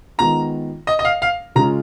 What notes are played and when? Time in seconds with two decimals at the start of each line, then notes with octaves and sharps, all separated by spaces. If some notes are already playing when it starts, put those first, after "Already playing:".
0.18 D#3 G#3 B3 F4 A#5
0.87 D#5
0.99 D#5
1.05 F5
1.22 F5
1.56 C#3 G#3 C#4 F4 A#5